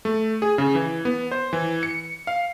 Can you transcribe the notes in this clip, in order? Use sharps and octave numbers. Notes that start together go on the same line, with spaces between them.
A3
G#4
C#3
E3
B3
C5
E3
C#7
F5